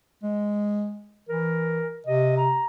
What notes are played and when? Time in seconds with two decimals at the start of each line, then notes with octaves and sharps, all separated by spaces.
0.23 G#3
1.29 E3 A#4
2.07 C3 D#5
2.37 A#5